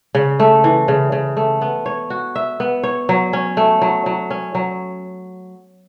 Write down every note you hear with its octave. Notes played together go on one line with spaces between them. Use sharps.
C#3
A3
E3
C#3
C#3
A3
B3
C#5
F#4
E5
B3
C#5
F#3
C#4
A3
F#3
F#3
C#4
F#3